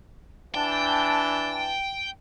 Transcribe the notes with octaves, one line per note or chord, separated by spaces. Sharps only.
E3 D4 G5 A5